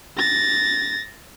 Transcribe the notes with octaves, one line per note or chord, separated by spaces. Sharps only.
A6 A#6